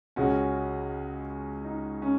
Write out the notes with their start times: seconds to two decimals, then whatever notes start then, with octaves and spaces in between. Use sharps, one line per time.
0.16 C#2 C#3 G#3 C#4 F#4
1.64 D#4
2.02 C#4